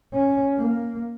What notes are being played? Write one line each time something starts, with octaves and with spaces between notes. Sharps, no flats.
C#4
A#3